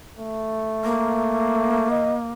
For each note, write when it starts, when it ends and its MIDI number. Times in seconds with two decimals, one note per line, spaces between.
0.19 1.86 57
0.84 2.32 58
1.91 2.17 75